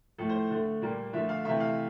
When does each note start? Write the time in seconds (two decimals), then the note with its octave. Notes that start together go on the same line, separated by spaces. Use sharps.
0.18 A2 F3 A3 A4
0.29 C5
0.50 D3 A3
0.82 A#2 G3 A#3
1.13 D3 F3 A3 E5
1.29 F5
1.45 C3 E3 A3 E5
1.60 F5